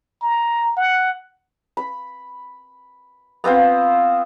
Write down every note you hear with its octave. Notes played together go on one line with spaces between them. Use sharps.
A#5
F#5
B5
B3 C4 F4 C5